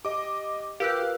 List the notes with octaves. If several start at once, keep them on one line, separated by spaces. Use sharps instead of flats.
G4 D#5 D6
F4 G4 A#4 B4 F5 E6 F#6